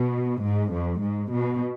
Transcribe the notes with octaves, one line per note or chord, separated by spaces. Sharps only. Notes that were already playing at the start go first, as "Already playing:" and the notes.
Already playing: B2
G#2
F2
G#2
B2